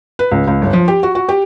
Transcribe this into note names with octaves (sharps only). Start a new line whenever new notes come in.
B4
C#2
C#2
G1
F3
G4
F#4
F#4
G4